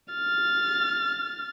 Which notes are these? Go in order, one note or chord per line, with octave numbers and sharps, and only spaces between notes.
F6 A6